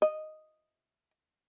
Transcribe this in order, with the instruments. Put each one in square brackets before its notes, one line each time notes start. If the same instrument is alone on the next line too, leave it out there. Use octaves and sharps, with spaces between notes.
[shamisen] D#5